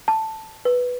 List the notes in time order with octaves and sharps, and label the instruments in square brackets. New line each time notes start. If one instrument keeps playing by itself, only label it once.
[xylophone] A5
B4